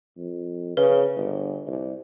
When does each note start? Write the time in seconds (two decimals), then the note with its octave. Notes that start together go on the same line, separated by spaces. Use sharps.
0.17 F2
0.77 C#3 B4
1.16 G1
1.67 C2